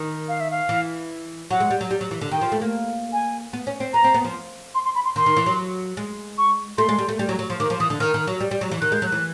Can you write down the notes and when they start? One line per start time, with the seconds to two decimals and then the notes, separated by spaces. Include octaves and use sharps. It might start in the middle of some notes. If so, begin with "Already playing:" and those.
Already playing: D#3
0.28 F5
0.40 E5
0.51 F5
0.69 E3
1.50 F#3 F#5
1.60 G#3
1.70 G3
1.81 F#3
1.91 G3
2.01 F#3
2.11 E3
2.21 D3
2.31 D#3 G5
2.41 F3
2.52 A3
2.61 A#3
3.13 G#5
3.53 B3
3.67 C#4
3.80 C4
3.93 B3 A#5
4.04 C4
4.14 B3
4.24 F3
4.75 C6
4.85 C6
4.95 B5
5.05 C6
5.16 D#3 C6
5.26 D#3
5.36 E3
5.46 F#3
5.97 G#3
6.38 C#6
6.78 A3 C6
6.89 G#3
6.98 G3
7.09 A3
7.19 G3
7.29 F#3
7.39 F#3
7.50 F3
7.60 D#3 D6
7.70 F3
7.80 E3 D#6
7.90 D3
8.00 D#3 F6
8.14 D#3
8.27 F#3
8.40 G3
8.51 G3
8.61 F#3
8.71 E3
8.81 D#3 F#6
8.92 G#3 G6
9.02 F#3
9.06 F#6
9.12 E3